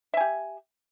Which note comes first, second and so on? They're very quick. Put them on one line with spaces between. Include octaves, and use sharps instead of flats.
E5 G#5 G4